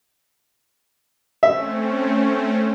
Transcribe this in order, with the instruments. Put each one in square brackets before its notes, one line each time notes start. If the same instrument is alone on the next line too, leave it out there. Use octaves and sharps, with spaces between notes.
[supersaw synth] A3 C4 C#4 [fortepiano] E5